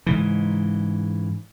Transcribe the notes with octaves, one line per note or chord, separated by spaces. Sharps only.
G#2 C#3 E3